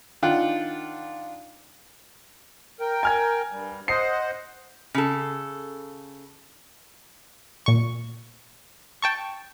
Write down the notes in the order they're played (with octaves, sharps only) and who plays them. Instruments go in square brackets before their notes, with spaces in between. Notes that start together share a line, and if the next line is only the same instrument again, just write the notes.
[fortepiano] D#3 D4 F4 F#5 G5 F#6
[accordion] A#4 G5
[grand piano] G#5 F6 G#6
[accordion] G2 G3
[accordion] C5 D#5 F#5 [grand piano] D#6 C7
[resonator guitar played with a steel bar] C#3 A4
[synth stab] A#2 C#6
G5 A5 C#6